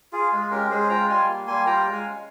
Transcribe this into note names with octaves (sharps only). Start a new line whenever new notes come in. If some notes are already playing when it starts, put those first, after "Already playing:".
F4 G#4
G#3 G#4
C#4 G4 A#4
G#3 G#4 C5
F4 G5 A#5
G3 G#5 C6
A#3
G3 G#5 C6
F4 G5 A#5
G#3
F5 G#5
C#4